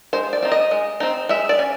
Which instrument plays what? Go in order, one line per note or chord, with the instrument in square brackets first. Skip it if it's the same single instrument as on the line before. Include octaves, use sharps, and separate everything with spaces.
[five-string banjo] G#3 C5
D5
C4 D#4
D#5
G#3
C4 D#4
G#3 E5
D5
C#4